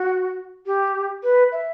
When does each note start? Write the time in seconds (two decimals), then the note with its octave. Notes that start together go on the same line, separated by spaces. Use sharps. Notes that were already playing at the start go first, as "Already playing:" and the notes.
Already playing: F#4
0.66 G4
1.23 B4
1.52 E5